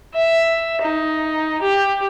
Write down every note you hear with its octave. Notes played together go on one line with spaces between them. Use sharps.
E5
D#4
G4